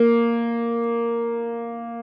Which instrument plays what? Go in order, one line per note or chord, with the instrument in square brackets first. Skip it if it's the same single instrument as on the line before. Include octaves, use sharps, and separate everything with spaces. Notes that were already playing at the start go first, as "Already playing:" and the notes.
Already playing: [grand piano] A#3